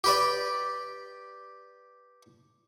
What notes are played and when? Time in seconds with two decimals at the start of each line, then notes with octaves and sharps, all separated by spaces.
0.04 G4 B4 D5